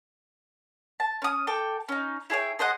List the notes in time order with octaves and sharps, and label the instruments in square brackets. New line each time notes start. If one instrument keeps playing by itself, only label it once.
[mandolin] A5
C#4 D#6
A4 G5 D6
C#4 D#4
E4 G#4 C#5 G5
G#4 C5 D#5 F#5